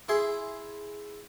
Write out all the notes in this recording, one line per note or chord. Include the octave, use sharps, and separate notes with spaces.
E4 G#4 C6